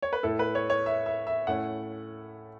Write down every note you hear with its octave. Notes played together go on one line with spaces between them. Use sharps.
C#5
B4
A2 A3 E4 A4
B4
C#5
C#5
E5
E5
E5
A2 A3 C#4 E4 F#5